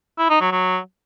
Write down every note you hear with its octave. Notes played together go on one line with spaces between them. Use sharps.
E4
D#4
F#3
F#3